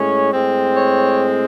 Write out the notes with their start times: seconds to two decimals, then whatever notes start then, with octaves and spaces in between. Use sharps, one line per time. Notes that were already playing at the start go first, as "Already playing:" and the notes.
Already playing: A2 G#3 C#4 C#5
0.33 A2 G#3 C4
0.76 C#5